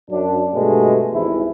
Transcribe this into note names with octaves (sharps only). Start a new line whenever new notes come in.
F#2 D4
G2 B2 G#3 A3
G#1 E2 C3 E3 E4